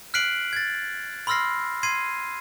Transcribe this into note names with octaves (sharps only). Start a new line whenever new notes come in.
F6 F#6 B6 C7 D7 F#7
G#6 A6
B5 C6 E6 F6 A#6 C7
C6 G#6 C7 D#7